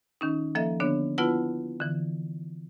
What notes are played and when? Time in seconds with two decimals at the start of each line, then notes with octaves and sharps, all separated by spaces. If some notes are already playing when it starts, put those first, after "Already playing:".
0.21 D#3 C#4 D#4
0.55 F3 A#3 A4 D#5 E5
0.80 D3 B3 D4 C#5
1.18 B3 E4 F4 B4 F#5 A5
1.80 D3 E3